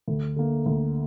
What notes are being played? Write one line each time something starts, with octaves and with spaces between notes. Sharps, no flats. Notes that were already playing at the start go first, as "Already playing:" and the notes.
D2
D3 A#3
D2